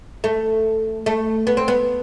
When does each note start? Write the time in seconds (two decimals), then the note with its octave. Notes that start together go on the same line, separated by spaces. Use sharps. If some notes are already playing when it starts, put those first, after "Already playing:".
0.24 A3
1.06 A3
1.47 B3
1.57 C4
1.68 B3